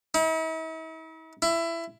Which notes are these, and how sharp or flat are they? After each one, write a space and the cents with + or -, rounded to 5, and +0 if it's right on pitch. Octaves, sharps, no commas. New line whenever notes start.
E4 -45
E4 +20